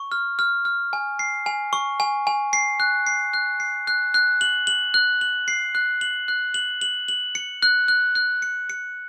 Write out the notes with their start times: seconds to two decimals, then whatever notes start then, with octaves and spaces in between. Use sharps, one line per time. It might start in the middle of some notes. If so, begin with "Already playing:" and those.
Already playing: C#6
0.12 F6
0.39 F6
0.65 F6
0.93 G#5
1.19 C7
1.46 G#5
1.73 C#6
2.00 G#5
2.27 G#5
2.53 C7
2.80 F#6
3.07 C7
3.33 F#6
3.60 C7
3.87 F#6
4.14 F#6
4.41 F#7
4.67 F#7
4.94 F#6
5.21 F#7
5.48 C7
5.75 F#6
6.01 F#7
6.28 F#6
6.54 F#7
6.81 F#7
7.08 F#7
7.35 C#7
7.63 F#6
7.88 F#6
8.15 F#6
8.42 C#7
8.70 C#7